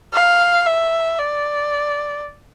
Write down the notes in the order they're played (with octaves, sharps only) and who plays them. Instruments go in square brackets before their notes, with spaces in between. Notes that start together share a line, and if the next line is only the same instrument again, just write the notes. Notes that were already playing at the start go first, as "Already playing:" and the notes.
[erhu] F5
E5
D5